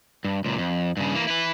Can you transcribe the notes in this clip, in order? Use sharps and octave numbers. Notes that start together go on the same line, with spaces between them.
G2
C#2 A#2
F2
G2 C#3
E3 A#3
E4 B4